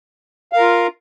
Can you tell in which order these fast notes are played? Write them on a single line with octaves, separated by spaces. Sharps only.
F5 A#4 F4